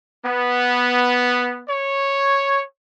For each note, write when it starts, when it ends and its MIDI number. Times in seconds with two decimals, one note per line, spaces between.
0.24 1.62 59
1.68 2.62 73